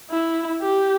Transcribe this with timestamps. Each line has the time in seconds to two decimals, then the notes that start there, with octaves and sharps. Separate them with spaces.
0.10 E4
0.62 G4